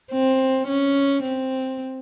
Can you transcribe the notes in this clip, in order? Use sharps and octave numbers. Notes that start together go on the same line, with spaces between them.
C4
C#4
C4